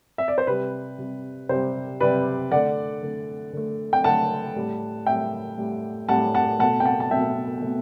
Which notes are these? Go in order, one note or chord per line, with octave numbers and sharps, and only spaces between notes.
E5
D5
C5
C3 G3 B4
C3 G3
C3 G3 C5
C3 G3 B4 D5
D3 A3 D5 F#5
D3 A3
D3 A3
G5
D3 A3 F#5 A5
A2 G3
A2 G3 E5 G5
A2 G3
A2 G3 F#5 A5
F#5 A5
B2 A3 F#5 A5
G5
F#5 A5
A5
B2 A3 E5 G5
B2 A3